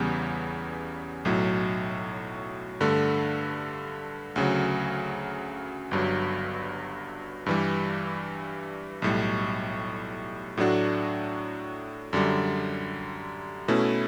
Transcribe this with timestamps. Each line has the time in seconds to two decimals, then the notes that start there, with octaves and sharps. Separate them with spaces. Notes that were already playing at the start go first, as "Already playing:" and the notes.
Already playing: E2 C#3 G3 B3
1.25 B1 A2 F#3
2.80 G2 D3 A3
4.36 D2 C#3 F#3
5.91 G1 G2 F#3
7.46 G2 E3 G3
9.02 B1 A2 G3
10.57 A2 F#3 A3 D4 F#4
12.13 F#2 D3 G3
13.68 B2 A3 C#4 E4